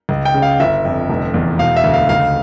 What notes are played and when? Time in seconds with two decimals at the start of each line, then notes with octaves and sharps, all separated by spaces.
0.09 C#2
0.25 G5
0.34 C#3
0.42 F5
0.60 G1 E5
0.85 F2
1.10 F1
1.34 E2
1.59 E1 F5
1.76 E5
1.84 D2
1.94 F5
2.09 C#2 F5